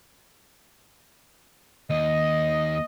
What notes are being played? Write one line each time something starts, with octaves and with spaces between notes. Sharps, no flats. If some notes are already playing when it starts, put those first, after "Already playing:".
D#2 D#5